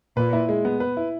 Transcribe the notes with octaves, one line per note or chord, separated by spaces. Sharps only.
A#2 B4
E4
G#3
B3
B4
E4